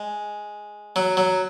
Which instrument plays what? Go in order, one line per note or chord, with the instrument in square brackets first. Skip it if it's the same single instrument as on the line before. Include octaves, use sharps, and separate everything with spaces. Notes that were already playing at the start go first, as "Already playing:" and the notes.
Already playing: [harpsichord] G#3
F#3
F#3